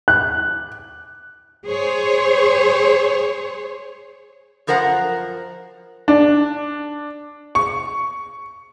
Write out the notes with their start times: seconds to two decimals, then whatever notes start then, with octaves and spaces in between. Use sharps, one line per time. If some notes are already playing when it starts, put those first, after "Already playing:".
0.08 F#6
1.66 G#4 C5 C#5
4.67 F#2 F3 A#4 C5 F#5 A#5
6.08 D4
7.55 C#6